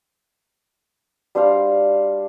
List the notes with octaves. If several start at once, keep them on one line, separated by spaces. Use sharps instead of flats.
G3 D4 C5 F5